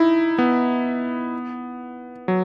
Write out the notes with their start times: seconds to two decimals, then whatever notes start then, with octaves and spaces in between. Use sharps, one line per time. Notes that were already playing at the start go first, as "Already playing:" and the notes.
Already playing: D#4 E4
0.38 B3
2.28 F#3